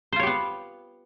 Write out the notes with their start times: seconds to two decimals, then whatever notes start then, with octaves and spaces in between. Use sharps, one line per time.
0.12 C5
0.16 F4
0.20 C#5
0.23 G4
0.27 B3